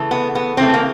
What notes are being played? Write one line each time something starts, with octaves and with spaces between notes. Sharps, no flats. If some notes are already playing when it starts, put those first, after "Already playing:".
Already playing: C#3 E3 A3
B3
B3
C#3 E3 A3 C4
A#3